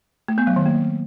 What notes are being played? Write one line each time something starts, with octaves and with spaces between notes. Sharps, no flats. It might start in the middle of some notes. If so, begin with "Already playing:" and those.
A3
B3
F#3
D#3
A#3